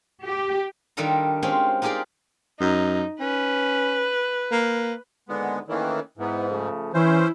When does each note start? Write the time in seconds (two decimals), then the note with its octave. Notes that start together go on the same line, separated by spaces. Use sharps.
0.24 G4
0.97 D#3 G3 D4 F4 A4 A#5
1.43 G#3 C4 C#4 F4 G4
1.82 D#4 F4 G4 G#4 A#4 D5
2.60 F#2 D#4
3.20 C#4 B4
4.51 A#3
5.29 D#2 G#2 D3 G#3 B3
5.68 D#3 E3 A3 A#3 C#4
6.18 G#2 E3 B3
6.50 C#3 F3 A3
6.94 E3 C#4 E4 C5